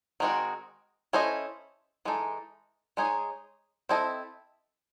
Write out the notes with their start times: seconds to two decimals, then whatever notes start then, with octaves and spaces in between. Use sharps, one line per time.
0.20 D#3 G#3 C4 F#4
1.13 C#4 E4 A4 C5 D#5
2.05 E3 G#3 D#4 A4
2.97 G#3 D#4 G#4 C#5
3.89 C4 E4 A4 D#5